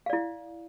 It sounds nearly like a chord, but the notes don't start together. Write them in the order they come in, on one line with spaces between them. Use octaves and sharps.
F5 D5 E4